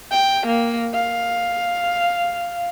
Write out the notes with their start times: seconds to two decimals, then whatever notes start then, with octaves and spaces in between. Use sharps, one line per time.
0.11 G5
0.47 A#3
0.95 F5